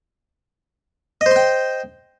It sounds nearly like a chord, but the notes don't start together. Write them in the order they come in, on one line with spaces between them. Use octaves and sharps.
D#5 C5 C6 G5